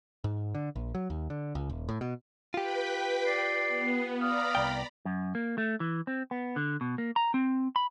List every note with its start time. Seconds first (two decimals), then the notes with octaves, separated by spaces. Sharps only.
0.24 G#2
0.55 D3
0.76 A#1
0.95 F#3
1.10 D#2
1.30 D3
1.55 C#2
1.69 D#1
1.89 A2
2.01 B2
2.54 F4 G4 B4 G5 B5
3.26 D5 C7
3.68 B3
4.21 D5 F5 A#5 B5 D#6
4.55 C2 G5
5.05 F#2
5.35 A#3
5.58 A3
5.80 E3
6.07 C4
6.31 B3
6.56 D3
6.81 B2
6.98 A#3
7.16 A#5
7.34 C4
7.76 B5